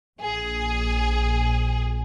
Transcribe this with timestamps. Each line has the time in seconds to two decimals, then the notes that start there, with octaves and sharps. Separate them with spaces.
0.20 A#1 G#4